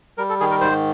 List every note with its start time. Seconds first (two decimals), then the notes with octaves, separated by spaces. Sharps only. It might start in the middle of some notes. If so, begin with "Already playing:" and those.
0.18 G3 A#4
0.29 A4
0.40 D#3 G#4
0.51 A#4
0.61 G#2 C5